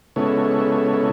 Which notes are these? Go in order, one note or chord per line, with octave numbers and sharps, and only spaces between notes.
C#3 G#3 B3 E4 A4 C#5